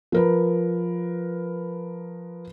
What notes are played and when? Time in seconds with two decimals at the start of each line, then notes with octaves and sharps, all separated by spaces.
0.12 F3 A#4 B4